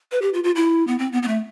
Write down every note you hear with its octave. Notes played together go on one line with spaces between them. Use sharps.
B4
G4
F4
F4
E4
B3
C4
B3
B3
A3